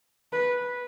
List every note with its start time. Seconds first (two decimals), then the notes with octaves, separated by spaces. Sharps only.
0.33 B4